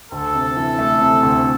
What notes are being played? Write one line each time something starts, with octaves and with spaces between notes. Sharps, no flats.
D2 A4
C3
E3
A3
C3
D2